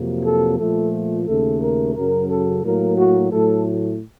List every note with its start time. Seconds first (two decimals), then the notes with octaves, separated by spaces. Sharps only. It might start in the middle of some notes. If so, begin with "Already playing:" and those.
Already playing: F2 C3 F#3 A#3
0.25 A4
0.58 A#2 F3 A3 A4
1.27 D#2 C#3 A3 A4
1.61 A#4
1.95 F#2 C#3 F#3 A#4
2.29 A4
2.64 A2 F#3 A#3 A#4
2.98 F#4
3.32 A2 F#3 A3 A4